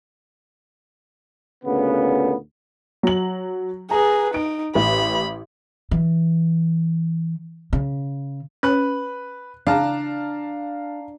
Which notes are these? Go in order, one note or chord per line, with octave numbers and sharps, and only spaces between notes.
D2 A#2 C#3 B3
F#3 F#7
G#4 B4 A#5
D#4 D7
A1 B5
E3
C#3
C#4 B4 F#6
C#3 D4 F5 A5 A#5